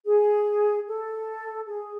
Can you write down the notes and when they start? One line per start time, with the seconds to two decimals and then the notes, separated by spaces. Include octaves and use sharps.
0.06 G#4
0.87 A4
1.67 G#4